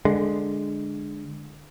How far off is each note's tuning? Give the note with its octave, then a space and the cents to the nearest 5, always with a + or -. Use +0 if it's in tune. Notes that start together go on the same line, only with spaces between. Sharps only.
D3 +5 G#3 +0